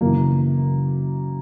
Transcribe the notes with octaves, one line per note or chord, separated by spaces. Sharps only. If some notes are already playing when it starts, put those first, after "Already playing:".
F#2 C#3 E3 A#3